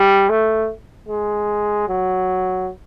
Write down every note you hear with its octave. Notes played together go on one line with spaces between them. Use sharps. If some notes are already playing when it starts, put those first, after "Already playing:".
Already playing: G3
A3
G#3
F#3